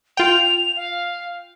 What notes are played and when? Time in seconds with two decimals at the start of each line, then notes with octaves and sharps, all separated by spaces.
0.17 F4 G5 F7
0.76 F5